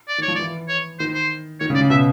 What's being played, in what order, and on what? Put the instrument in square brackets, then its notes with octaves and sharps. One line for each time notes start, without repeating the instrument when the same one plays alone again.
[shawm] D5
[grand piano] D#3
[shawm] C#5
[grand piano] F3
[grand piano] E3 [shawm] D5
[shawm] C#5
[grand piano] D#3 [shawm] C5
[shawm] C5
[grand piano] D#3 [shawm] C#5
[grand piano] C#3
[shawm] D5
[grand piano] C#3
[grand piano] B2 [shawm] E5